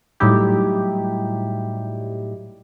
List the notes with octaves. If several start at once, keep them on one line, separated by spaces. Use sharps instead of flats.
A2 F#3 G3 D#4 E4 G4